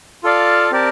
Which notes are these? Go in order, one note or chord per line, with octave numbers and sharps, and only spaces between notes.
F4 A4 D5 F5 A5
C4 G4 A#4 D5 A5